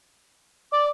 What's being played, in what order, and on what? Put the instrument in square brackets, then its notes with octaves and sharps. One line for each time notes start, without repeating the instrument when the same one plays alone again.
[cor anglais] D5 [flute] D6